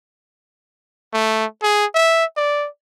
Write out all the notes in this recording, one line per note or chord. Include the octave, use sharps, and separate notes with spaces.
A3
G#4
E5
D5